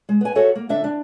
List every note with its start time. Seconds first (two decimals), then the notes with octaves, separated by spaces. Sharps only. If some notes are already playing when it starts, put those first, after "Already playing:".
0.09 G#3
0.21 B3 G#5
0.35 F#4 A4 C#5 E5
0.55 A#3
0.69 D3 D4 E5
0.84 D4